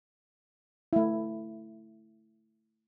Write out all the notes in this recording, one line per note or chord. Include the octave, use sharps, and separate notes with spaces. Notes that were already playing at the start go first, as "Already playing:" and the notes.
A3 E4